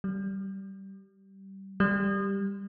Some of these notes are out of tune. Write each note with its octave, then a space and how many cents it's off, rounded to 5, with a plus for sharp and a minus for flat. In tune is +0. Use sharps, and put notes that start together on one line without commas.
G3 -20
G3 +5